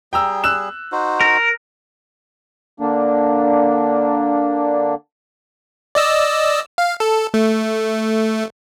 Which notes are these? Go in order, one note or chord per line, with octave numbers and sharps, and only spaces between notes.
G3 G#4 G5 A#5 E6
E6 F#6 E7
D#4 F#4 C5
A#4
D3 A#3 D4
D5 D#5 E6
F5
A4
A3